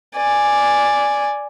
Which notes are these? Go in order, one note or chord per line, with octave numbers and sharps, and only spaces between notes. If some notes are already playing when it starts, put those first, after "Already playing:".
D5 G#5